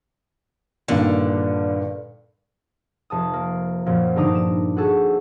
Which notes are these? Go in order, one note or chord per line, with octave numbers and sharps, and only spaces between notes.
G2 A#2 D3 D#3
F1 A5 D#6
A#3
F#2 A#2 F3 A#3
G2 D3 D#4 A#5 D6 D#6
E7
F#4 G#4 A4